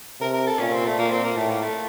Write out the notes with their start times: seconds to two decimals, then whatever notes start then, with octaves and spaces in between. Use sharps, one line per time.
0.20 C3 A#4
0.34 A#4
0.47 A4
0.59 A#2 C#4
0.72 C4
0.86 A3
0.98 A#2 A#3
1.11 C4
1.24 A#3
1.36 A2 A3
1.50 A#3
1.63 A3